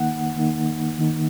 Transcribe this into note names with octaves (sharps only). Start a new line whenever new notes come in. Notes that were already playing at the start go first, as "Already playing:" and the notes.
Already playing: D#3 A#3 D#4 F#5
D#3 A#3 D#4
D#3 A#3 D#4